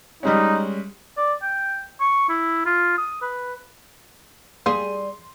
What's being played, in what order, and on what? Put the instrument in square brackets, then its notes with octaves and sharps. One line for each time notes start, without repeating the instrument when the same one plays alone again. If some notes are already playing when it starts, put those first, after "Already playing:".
[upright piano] G3 G#3 C#4 [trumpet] D#4
[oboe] D5
G5
C#6
E4
F4
D#6
B4
[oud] G3 G#4 [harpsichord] A#3 [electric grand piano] C6